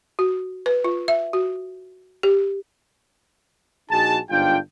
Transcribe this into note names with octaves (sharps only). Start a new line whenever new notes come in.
F#4
B4
F4
E5
F#4
G4
A#1 D#4 F#4 G#4 A5
G1 G#2 D4 F4 G5